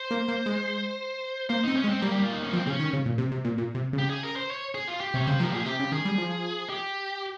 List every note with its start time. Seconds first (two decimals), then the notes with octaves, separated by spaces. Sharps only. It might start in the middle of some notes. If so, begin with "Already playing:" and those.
Already playing: C5
0.11 A#3
0.28 A#3
0.46 G#3
1.49 A#3 C5
1.63 C4 D#4
1.76 C#4
1.84 G#3
1.89 C4
2.02 G3 A#3
2.12 G4
2.23 F4
2.33 D#4
2.44 C#4
2.53 F3 C4
2.66 C#3 C4
2.70 C#4
2.80 D#3
2.93 C#3
3.06 A#2
3.18 C3
3.32 C3
3.45 A#2
3.58 A#2
3.75 C3
3.93 C#3
3.99 G4
4.10 G#4
4.23 A#4
4.36 C5
4.50 C#5
4.75 G#4
4.88 F4
5.01 G4
5.14 C3 C#5
5.27 C#3 C5
5.40 F3 A#4
5.52 A#2 G#4
5.66 C3 G4
5.80 C#3
5.92 D#3 G#4
6.05 G3
6.18 F3
6.70 G4